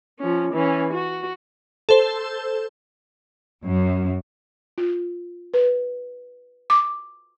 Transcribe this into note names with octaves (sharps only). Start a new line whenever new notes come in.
F3 C#4
E3 C#4
F#4
A4 C5
F#2
F4
B4
D6